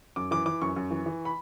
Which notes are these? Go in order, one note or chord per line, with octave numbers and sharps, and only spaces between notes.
F#2 D6
E3 D6
E3 D6
F#2 C#6
F#2
E3
E3
B5